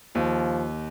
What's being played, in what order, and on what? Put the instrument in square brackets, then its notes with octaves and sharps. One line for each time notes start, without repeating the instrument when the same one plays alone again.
[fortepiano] D#2 [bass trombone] F3